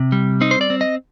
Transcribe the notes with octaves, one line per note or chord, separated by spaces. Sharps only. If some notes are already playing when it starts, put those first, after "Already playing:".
Already playing: C3
G3
C4 D#4
C5
D5
C4
D#5